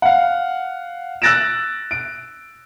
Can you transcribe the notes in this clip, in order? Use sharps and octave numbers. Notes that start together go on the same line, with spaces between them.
F5 F#5
E6 F#6 A6 A#6 D7 E7
D7